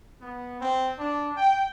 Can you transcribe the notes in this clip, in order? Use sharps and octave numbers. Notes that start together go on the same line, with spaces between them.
B3
C4
D4
G5